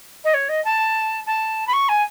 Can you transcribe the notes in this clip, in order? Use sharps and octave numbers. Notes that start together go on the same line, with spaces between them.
D#5
C#5
D#5
A5
A5
B5
C#6
G#5